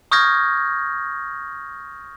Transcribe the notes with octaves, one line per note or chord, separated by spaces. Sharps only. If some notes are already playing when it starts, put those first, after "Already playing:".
C#6 D#6 F6 G6 G#6 A#6